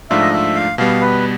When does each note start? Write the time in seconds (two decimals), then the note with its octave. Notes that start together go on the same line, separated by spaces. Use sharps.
0.10 G#2 F3 A3 D4 F4 E5
0.21 D#5
0.33 E5
0.55 F5
0.78 B2 G3 B3 F5
1.01 B4